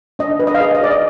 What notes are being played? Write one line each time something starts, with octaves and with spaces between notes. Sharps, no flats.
D4 D#5
B4
D#5
F5
G#4 D#5
D#5
G#4 D5
D#5